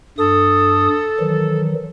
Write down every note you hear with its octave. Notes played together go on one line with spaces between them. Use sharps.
G2 A4 D#6
D#3 E3 F#3